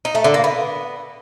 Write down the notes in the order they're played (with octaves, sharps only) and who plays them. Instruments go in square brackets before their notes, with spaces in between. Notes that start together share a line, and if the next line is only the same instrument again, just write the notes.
[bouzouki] D#4
A3
D3
A#3
B3